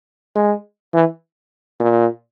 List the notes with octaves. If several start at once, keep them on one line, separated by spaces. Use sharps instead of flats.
G#3
E3
A#2